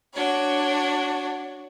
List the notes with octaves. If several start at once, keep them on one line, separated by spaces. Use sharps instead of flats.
D4 F#4 C#5